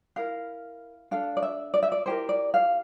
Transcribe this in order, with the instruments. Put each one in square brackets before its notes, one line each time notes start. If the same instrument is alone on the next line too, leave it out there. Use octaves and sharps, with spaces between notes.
[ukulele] E4 A#4 F5
D4 A4 F5
D5
E5
D5
E5
D5
E4 G4 A#4 C5
D5
F5